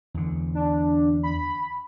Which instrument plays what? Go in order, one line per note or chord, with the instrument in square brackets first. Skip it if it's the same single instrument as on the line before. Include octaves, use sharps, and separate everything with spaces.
[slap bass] E2 D3
[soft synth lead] D4
B5